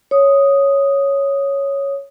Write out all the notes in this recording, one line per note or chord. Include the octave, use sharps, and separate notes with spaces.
C#5 D#6